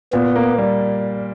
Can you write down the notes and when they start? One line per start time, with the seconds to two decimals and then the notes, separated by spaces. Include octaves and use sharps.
0.13 A#2 B3
0.36 A#3
0.58 G3